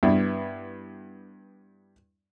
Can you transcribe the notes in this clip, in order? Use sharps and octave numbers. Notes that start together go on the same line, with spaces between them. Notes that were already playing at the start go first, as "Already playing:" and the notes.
G2 B3 E4